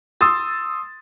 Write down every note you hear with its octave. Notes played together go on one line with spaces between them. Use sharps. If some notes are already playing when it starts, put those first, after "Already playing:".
C6 D#6 E6 A6